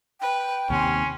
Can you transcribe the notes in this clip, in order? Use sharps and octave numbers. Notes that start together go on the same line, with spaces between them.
B4 G5
D#2 C3 C#4 G#5 C6